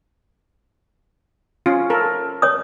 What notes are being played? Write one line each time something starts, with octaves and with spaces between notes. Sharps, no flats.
C#4 F4
A4 A#4
C#5 D#6